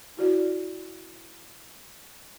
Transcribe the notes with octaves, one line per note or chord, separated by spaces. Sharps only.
E4 F#4 D5